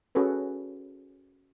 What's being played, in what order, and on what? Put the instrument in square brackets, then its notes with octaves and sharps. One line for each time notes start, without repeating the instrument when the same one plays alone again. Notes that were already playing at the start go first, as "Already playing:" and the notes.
[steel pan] C#4 F#4 G#4 A4 B4